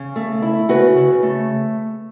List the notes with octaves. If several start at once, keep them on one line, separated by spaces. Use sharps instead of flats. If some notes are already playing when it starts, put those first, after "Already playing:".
Already playing: C#3
A3
E4
C#3 F#4 B4
C#3
A3